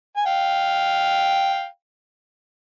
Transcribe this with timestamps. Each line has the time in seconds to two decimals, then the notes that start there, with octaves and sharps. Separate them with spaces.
0.16 G#5
0.26 F5 G5